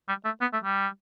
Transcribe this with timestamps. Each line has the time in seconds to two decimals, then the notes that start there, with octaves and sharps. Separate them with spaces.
0.08 G3
0.25 A3
0.41 B3
0.53 A3
0.64 G3